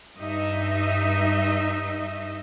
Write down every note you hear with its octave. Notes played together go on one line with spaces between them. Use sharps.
G2 D#4 D#5 E5